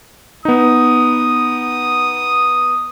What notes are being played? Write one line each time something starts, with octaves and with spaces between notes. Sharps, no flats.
B3 D#4 D#6